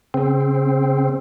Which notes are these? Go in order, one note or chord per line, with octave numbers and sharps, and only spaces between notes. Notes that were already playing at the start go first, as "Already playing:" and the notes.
C#3 C4